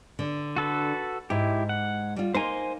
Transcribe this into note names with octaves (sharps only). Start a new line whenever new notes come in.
D3
F#4 A4 B4
G#2 E4 G4
F#5
G3 F4
A#3 D#4 C5 G#5 C6